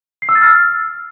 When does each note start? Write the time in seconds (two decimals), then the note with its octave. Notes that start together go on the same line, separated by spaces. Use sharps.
0.22 C7
0.29 E6
0.35 A6
0.42 F6